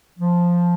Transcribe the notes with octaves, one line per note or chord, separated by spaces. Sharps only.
F3